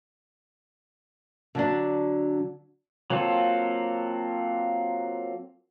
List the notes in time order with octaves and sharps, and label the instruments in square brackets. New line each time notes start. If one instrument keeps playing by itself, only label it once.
[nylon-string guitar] D3 F#3 D4
[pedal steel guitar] F#3 A#3 C4 F4 A4